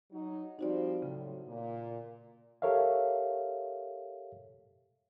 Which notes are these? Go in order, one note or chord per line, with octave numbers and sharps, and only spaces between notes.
F#3 D#4
F3 G3 C4 D#4 F#4 D5
A2 C#3 F#3
A#2
G4 A4 A#4 C#5 E5 F5